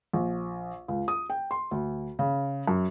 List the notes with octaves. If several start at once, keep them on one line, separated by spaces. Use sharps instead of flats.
A#1
C#2
D#6
G5
C6
D2
C#3
F#2